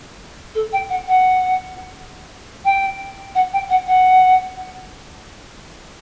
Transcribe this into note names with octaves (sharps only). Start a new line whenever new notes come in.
A4
G5
F#5
F#5
G5
F#5
G5
F#5
F#5